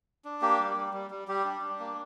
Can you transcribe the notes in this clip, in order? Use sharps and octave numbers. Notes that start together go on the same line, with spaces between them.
D4
A#3 G4
G3
G3
G3
G3
G3 G4
D4
D4
A#3